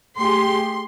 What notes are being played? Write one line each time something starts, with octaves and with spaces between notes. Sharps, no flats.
A3 G4 G#4 C6